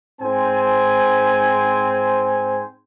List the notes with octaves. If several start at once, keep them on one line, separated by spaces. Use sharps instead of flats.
G#2 C4 C5 G#5